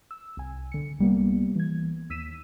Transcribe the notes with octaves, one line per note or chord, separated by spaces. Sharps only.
E6
C2 G#5
D3 C#7
C2 G3 A#3 B3
E3 G#6
D#2 E6 B6 D#7 E7